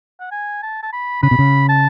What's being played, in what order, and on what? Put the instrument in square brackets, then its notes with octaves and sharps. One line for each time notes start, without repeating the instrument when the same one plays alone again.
[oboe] F#5
G#5
A5
A5
B5
[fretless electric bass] C#3 [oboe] B5
[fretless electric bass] B2
C#3
[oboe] A5